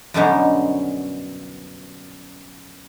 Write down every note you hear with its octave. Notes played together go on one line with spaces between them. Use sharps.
F#2 B2 D3 G3 C#4 D#4